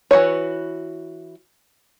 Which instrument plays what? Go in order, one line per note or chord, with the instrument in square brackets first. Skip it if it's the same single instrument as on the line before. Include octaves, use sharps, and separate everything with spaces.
[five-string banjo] E3 F#4 B4 C#5